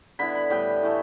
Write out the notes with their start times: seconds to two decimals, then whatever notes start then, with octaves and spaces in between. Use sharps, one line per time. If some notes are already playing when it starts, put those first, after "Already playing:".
0.19 D3 B3 E4 B5
0.35 B5
0.50 A2 G3 B3 D4 G5
0.83 A2 E3 A3